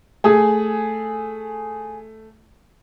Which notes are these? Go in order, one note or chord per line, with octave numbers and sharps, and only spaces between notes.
A3 G#4 G#5